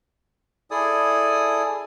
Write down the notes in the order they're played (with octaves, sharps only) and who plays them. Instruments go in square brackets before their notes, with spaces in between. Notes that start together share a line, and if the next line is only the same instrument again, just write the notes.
[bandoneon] E4 G#4 A4 D5 G#5 D#6